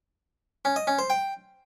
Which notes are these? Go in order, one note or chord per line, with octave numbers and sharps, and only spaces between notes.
C#4
D#5
C#4
C5
G5